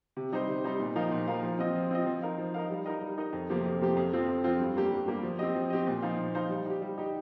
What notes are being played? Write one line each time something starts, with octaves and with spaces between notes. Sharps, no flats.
C3
G3 D#4 C5
C3
G3 D#4 C5
A#2
F3 D#4 A#4 F5
A#2
F3 D#4 A#4 F5
F3
C4 F4 D#5
F3
C4 F4 D#5
F3
D#4 A#4 F5
F3
D#4 A#4 F5
G3
D#4 A#4 D#5
G3
D#4 A#4 D#5
F2
C3 F3 A#3 G4
F2
C3 F3 A#3 G4
F2
F3 C4 F4
F2
F3 C4 F4
G2
G3 A#3 G4
G2
G3 A#3 G4
F3
C4 G4 D#5
F3
C4 G4 D#5
A#2
F3 D#4 C5 F5
A#2
F3 D#4 C5 F5
G3
D#4 G4
G3
D#4 G4